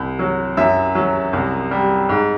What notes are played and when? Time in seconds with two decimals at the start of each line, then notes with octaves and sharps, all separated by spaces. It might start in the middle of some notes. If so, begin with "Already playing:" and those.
Already playing: C2
0.19 F#3
0.57 F#2 E5
0.95 F#3
1.33 C2
1.71 G3
2.09 G#2